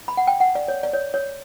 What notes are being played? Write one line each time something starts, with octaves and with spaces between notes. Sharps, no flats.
B5
F#5
G5
F#5
D5
C#5
D5
C#5
C#5